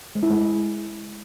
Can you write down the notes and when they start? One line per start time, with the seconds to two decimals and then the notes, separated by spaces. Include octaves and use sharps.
0.15 G#3
0.23 E4
0.30 G#3